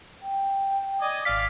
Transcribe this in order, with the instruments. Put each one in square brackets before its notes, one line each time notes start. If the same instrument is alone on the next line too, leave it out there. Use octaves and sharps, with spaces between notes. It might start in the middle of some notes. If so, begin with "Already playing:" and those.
[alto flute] G5
[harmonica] D5 D#5 G#5
[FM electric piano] G#1 B6 [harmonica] D5 F5 D6